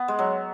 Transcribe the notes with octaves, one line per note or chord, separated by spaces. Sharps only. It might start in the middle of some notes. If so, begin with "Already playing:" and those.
Already playing: B3
G#3
F#3